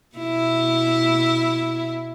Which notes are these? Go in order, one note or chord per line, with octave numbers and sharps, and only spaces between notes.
B2 E4